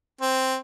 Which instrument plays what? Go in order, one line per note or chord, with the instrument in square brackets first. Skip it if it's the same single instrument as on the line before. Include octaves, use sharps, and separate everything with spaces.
[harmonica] C4